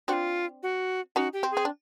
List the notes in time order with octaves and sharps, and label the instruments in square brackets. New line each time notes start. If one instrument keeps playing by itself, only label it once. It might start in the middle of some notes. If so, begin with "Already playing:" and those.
[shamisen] C4 D4 [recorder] F4 F#4
[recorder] F#4
[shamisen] C#4 D#4 [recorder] F#4
[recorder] G4
[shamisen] C4
[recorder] G#4
[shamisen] C4
D4